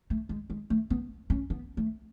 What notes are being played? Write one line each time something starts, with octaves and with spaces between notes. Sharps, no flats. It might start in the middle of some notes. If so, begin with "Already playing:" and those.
A3
G#3
G#3
A3
B3
C#4
B3
A3